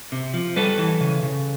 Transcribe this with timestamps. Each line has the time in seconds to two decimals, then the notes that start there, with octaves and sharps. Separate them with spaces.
0.12 C3
0.34 F3
0.56 G3 A4 B4
0.78 E3
1.01 C#3
1.23 C#3